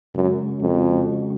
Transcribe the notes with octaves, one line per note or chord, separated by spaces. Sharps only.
F#2 C#3 G#3 C#4 F#4
F2